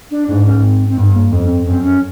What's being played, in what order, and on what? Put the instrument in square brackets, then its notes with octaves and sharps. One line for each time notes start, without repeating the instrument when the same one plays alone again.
[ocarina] D4
[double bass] G#2 [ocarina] D4
[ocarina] C#4
C4
C4
[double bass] G2 [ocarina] B3
[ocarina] A#3
[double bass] F2 [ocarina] B3
[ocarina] C#4
C4
[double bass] F#2 [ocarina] C4
[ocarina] C#4